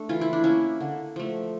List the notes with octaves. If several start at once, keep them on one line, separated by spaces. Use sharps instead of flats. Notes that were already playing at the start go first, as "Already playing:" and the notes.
Already playing: A3 D4
E3 F4
E4
D4
A#3 C#4 E4
D3
F3 A3